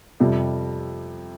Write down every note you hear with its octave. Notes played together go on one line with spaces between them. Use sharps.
F2 C3 G3